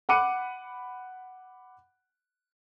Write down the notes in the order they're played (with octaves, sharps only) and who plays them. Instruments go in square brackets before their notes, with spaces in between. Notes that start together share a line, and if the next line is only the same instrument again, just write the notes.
[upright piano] F#5 B5 D6 F#6 C#7 D#7